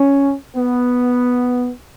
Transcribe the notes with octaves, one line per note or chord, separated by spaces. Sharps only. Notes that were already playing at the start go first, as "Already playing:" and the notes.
Already playing: C#4
B3